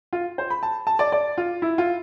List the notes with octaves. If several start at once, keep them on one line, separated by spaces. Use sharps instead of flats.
F4
C5
B5
A5
A5
D5
D5
F4
E4
F4